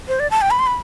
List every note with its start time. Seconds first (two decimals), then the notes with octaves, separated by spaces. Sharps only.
0.08 C5
0.20 D5
0.31 A5
0.42 G5
0.51 B5
0.59 C6
0.67 B5